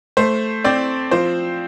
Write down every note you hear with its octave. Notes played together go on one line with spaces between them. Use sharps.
A3 C5
C4 D5
F3 C5